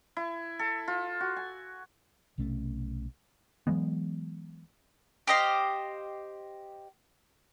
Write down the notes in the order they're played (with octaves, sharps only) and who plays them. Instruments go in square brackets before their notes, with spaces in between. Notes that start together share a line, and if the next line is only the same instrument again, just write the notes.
[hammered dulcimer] E4
A4
F4
F#4
G#5
[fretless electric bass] B1 C3 A3 C#4
[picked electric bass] E3 F#3 G#3 B3
[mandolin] G4 C5 D#5 F5